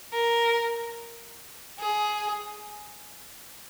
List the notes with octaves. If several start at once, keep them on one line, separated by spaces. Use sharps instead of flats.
A#4
G#4